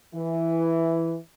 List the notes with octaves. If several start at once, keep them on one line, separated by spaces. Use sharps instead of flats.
E3